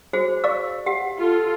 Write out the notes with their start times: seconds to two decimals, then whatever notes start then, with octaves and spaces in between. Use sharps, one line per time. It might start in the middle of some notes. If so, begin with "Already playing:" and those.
0.13 F#4 G#4 C5
0.44 D5 F5 C#6 E6
0.86 G4 F5 F#5
1.19 F4 A4